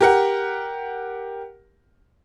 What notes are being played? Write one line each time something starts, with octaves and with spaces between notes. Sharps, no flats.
G4 A#4 F#5